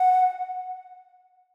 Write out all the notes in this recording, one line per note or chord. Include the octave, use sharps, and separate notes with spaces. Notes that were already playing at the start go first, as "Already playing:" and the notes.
Already playing: F#5